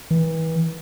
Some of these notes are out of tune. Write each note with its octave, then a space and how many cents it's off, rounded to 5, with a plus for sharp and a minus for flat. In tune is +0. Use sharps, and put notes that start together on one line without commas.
E3 -30